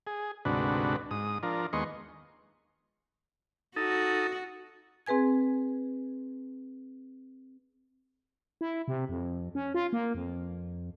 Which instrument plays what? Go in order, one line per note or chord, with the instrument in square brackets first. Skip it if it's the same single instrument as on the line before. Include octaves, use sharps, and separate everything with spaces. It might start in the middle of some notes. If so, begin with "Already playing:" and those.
[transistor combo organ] G#4
D2 G#2 C3 D4 F#4 B4
G#2 D#6
F3 D4 A#4
D#2 G#3 B3 D#5 C6 C#6
[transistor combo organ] D#4 A4 [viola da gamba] F#4
[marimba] C4 G#4 B4 G#5 G#6
[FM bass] E4
C3
F2
C#4
F4
A#3
F2